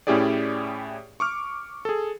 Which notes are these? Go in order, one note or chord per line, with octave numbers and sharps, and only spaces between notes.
A2 C#4 E4 G4 G#4 D5
C#6 D6 F6
G#4 A4